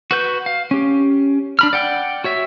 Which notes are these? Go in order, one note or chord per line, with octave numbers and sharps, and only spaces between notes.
F#4 B4 G6
F5
C#4 G4
D4 B5 F6
D5 F#5 G5
F#4 C#5 E5